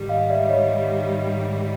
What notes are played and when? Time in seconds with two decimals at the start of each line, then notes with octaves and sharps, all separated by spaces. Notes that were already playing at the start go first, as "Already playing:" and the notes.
Already playing: G#2 D#3 G3
0.09 D#5 F5
0.30 D5 E5
0.40 E5
0.49 C#5 D#5